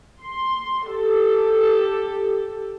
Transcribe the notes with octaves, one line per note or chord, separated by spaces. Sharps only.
C6
G4 A4